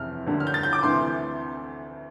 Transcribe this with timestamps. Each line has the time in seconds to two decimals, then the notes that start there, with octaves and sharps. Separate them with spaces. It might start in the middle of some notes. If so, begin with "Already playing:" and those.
Already playing: F1 E2 C3 E3 F6
0.26 D2 D3 G3 A#3
0.40 F6
0.47 G6
0.54 A6
0.63 G6
0.73 D6
0.83 D2 C3 E3 A3 C6